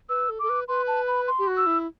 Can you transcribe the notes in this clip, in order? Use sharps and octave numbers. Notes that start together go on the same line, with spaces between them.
B4 E6
A4
A4 D6
B4
B4 C6
A5
B5
C6
G4
F#4
E6
E4